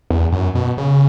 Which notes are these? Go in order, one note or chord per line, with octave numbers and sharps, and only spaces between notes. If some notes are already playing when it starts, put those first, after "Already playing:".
E2
F#2
B2
C#3